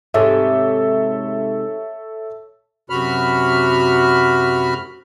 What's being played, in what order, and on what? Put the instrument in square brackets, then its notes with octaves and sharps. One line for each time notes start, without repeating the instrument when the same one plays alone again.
[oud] G#2 C3 [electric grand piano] A4 C#5 E5
[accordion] F#2 C3 F#4 B5 F6